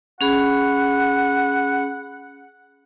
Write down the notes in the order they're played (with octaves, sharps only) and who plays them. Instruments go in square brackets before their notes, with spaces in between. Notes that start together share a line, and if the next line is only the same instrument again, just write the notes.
[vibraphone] C#4 G#4 B5 [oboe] F#5